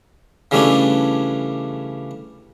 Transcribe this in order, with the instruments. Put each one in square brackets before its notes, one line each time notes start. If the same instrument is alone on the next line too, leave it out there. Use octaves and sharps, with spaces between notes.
[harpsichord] C#3 E3 G3 A3 C#4 D4